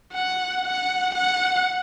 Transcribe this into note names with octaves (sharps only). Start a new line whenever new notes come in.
F#5
F#5
F#5